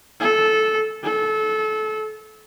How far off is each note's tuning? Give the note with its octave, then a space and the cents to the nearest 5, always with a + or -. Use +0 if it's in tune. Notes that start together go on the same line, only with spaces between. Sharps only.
A4 -15
A4 -25